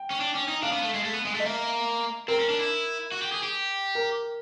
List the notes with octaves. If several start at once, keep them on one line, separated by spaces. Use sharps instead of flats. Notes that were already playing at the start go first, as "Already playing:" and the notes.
Already playing: G5
C#4
D4
C#4
D#4
D4 F5
B3
A3
G#3
A3
B3
G#3
A3
D#5
A#3 E5
C4 A#4
C#4
D4
E4
F#4
G4
G#4
G4
A#4